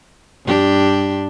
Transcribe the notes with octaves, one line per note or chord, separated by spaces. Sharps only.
G2 D4 G4